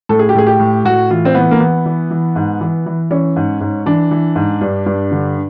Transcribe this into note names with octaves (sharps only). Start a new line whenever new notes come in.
A2 A4
G#4
G4
A2 G#4
G4
A2
A2 F#4
E3 F4
C4
E3 B3
A#3
E3 B3
E3
E3
G#2
E3
E3
E3 C#4
G#2
G#2
E3 D4
E3
G#2
G2
G2
D3